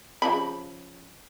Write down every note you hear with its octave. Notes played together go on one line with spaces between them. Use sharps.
C#3 F3 B5